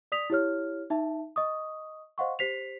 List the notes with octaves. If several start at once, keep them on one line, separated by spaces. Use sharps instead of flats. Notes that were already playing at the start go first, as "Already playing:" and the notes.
D5 D#6 B6 F7
E4 G4 C#5 F6
D#4 E5 A5
D#5 C#6 D#6
C5 D#5 F5 F#5 C6 C#6
G4 C5 B6 C7 F7